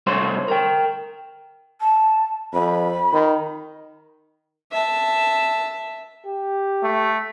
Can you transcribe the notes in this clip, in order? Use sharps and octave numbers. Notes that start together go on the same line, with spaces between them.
C2 A3 C5 C#5 C6
A#4 G5
A5
F2 B5
D#3
E5 A5
G4
A3